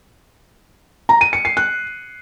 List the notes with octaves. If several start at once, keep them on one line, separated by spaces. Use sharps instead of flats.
A#5
D#7
C#7
C7
F#6